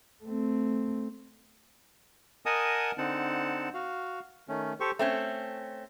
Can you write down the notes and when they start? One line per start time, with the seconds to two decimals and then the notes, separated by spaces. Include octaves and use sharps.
0.24 A3 C4
2.46 A#4 D#5 F#5 G#5 A5 D#6
2.98 D3 C4 D#4 F#5 A5
3.74 F#4 F5
4.48 D#3 A3 C#4
4.80 G4 A4 C5 C#6
4.99 A3 C4 C#4